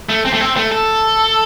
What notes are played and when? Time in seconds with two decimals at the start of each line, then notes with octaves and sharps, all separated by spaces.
0.09 A3
0.25 C4
0.33 A3
0.41 C4
0.57 A3
0.72 A4